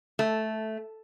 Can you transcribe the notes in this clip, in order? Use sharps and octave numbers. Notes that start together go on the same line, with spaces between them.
A3